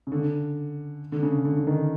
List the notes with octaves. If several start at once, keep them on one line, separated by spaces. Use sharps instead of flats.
C#3
D3
D3
C#3
D3
D3
D#3